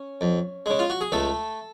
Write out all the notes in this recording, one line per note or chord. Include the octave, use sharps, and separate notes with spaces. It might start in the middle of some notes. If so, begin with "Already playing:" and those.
Already playing: C#4
F2
C#3 G#3
F4
F#4
G#4
C#2 A3 A4